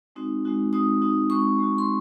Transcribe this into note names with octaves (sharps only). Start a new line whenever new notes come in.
G#3 C4 D#4 F#4
G#3 C4 D#4 F#4
G#3 C4 D#4 F#4 D#6
G#3 C4 D#4 F#4
G#3 C4 D#4 F#4 C#6
G#3 C4 D#4 F#4
C6